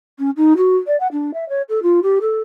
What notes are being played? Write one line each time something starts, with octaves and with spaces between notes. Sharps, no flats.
C#4
D#4
F#4
D5
F#5
D4
E5
C#5
A4
F4
G4
A4